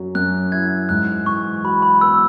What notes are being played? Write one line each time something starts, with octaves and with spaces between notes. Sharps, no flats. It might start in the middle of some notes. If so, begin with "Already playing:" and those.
Already playing: F#2 F#3
F#2 F#6
E4 G#6
G#2 F#6
E3 C#6
F#4 B5
B5
B3 E6